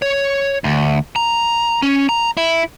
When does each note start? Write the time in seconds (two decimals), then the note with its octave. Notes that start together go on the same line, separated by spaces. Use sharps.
0.02 C#5
0.64 D2
1.16 A#5
1.82 C#4
2.09 A#5
2.37 E4